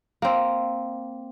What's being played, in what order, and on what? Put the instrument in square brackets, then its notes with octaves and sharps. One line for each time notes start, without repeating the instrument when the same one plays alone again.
[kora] A#3 C4